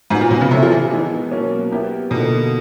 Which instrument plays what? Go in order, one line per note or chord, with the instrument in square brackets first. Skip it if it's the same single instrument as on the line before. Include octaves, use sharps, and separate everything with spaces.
[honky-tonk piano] G#2 [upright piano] F#3 B3 D#4 F#4
[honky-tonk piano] A#2
B2
C#3
[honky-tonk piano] C3 [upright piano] C4 E4 A4 C#5 E5
[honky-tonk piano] F3
E3
[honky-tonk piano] E3 [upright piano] G#3 B3 D#4
[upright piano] B2 F#3 A#3 C#4
B3 E4 G4 A#4
[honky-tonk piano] B2 [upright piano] D3 F3 A#3 D#4